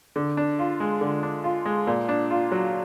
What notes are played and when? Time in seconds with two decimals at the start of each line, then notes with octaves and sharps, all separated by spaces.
0.16 D3
0.37 D4
0.59 F4
0.80 G#3
1.01 D3
1.23 D4
1.44 F4
1.66 G#3
1.87 A#2
2.09 D4
2.31 F4
2.52 F#3